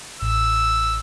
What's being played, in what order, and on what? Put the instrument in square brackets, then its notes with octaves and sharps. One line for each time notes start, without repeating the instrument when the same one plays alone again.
[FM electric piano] A1 [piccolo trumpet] E6